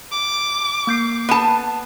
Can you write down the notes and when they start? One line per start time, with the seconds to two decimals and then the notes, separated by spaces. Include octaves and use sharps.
0.12 D6
0.87 A#3 G6 C7
1.29 B3 A5